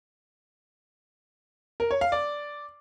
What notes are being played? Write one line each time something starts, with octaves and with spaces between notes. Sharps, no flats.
A#4
C#5
F5
D5